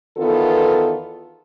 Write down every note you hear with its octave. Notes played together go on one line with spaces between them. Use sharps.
E2 D#3 B3 F4 A4